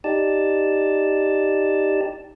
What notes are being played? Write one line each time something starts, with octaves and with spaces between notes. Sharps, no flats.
D#4 G4 D5 A5